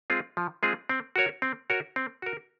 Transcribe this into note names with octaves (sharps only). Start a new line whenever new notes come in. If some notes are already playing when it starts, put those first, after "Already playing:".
G#3 C4 F4 G#4
F3
G#3 C4 F4 G#4
C4
F#4 A#4 C#5
C4
F#4 A#4 C#5
C4
F#4 A#4